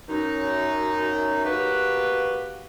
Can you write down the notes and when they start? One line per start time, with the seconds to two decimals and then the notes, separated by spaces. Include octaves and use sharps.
0.08 F#2 D#4
1.44 A#3 F#4 G4 B4